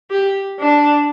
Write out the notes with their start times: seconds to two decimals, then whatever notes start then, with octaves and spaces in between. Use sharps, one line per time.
0.10 G4
0.59 D4